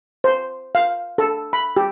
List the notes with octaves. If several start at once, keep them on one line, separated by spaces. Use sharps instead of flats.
C5
F5
A4
B5
G4